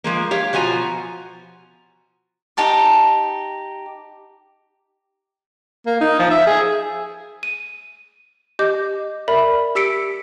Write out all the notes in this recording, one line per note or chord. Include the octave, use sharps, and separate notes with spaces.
F3 G#3 A#3
G4 C#5 F5
B2 F3 F#4 G#5 A#5
D#4 G4 A5 D6
A#3
D#4
F3
E5
G#4
D#7
G4 D#5 D6 G6
A#4 D5 E5 B5
G4 E6 B6 C#7 D7